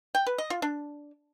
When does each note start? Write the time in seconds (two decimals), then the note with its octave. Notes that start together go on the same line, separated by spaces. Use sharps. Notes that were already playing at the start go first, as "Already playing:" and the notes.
0.15 G5
0.26 B4
0.38 D#5
0.50 F4
0.62 D4